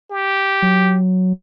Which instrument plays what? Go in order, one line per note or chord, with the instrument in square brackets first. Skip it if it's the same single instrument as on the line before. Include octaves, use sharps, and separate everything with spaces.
[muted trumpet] G4
[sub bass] F#3